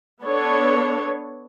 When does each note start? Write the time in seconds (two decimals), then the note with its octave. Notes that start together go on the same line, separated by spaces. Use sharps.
0.23 B3 D4 A4 C#5